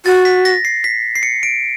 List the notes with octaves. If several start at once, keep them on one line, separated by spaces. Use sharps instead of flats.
F#4 A6
B6
A#6
C7
B6
C7
C#7
D7